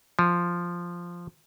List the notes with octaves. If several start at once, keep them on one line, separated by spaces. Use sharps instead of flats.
F3